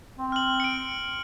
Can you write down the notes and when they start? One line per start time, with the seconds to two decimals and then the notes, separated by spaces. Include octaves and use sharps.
0.19 C4
0.32 F6 F#7
0.60 C#7 D7